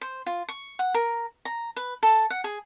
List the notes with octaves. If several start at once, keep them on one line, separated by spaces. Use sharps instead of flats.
C5
F4
C#6
F#5
A#4
A#5
B4
A4
F#5
G#4